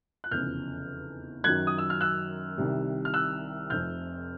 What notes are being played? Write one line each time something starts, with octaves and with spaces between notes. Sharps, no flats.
F#6
F1 E2 C#3 F3 F6 G6
F#2 D#3 F#3 F#6 G#6
D#6
E6
F6
E6 F#6
C2 C3 D#3 G3
F6
E6 F#6
F1 F2 C3 F6 G6